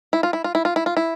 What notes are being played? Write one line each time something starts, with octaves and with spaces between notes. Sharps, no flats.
E4
F4
E4
F4
E4
F4
E4
F4
E4